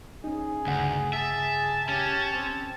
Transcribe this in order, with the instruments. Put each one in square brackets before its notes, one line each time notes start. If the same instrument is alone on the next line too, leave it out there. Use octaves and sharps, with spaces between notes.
[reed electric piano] C#4 D#4 [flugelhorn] G#4
[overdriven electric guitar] D2 [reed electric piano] G2 C#3 F#5
[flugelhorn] G#4 [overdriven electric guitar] E5 [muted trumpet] A5
[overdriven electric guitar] C#4 [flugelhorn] G4
[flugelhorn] C4